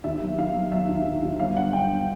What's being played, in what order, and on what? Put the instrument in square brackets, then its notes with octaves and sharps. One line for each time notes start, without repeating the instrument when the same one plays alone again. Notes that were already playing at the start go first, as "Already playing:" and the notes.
[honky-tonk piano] D#2 E5
F#3
D#3 F5
F#3
F#3 E5
D#2
D#2
D#2
G1 F5
D3 F#5
D3 G5